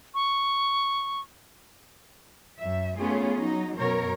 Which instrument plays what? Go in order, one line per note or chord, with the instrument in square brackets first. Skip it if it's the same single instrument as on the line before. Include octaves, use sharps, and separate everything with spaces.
[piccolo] C#6
[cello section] F#2 E5
A3 B3 C#4 F4 G#4
F#3 D#4
F#2 B2 A#4 C#5